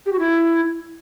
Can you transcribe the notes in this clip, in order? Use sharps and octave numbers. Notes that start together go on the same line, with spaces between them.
G4
F#4
E4